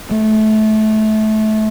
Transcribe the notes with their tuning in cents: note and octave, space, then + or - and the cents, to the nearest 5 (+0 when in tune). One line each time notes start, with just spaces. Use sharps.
A3 -25